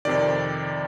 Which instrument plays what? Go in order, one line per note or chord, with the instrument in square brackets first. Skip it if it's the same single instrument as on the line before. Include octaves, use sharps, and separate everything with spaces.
[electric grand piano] F2 C3 D#3 D5